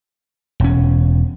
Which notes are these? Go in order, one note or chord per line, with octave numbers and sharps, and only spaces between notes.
E1 C#4